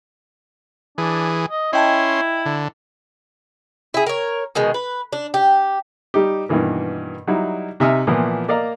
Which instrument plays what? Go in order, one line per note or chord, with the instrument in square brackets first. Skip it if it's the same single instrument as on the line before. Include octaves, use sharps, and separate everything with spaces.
[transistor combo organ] E3 G#4 [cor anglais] D4
[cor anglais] D#5
[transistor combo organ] C#4 C6 [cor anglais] E4 [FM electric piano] D#5 G5 A5
[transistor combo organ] D3
[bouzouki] E4 G#4
A#4 C#5
B2 D#3 G#3
B4
D4
G4
[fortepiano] G3 D#4 G4
G2 B2 D#3 E3 A#3
F#3 G3 D#4 E4
C3 D#4 E5 G#5 D#6 F6
A#2 E3 F3 B3 E4
A#3 D5 D#5 F5 A#5